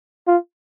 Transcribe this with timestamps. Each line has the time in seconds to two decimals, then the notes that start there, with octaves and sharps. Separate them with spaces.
0.27 F4